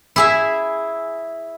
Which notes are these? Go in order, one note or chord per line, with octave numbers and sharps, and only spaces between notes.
E4 G#4 E5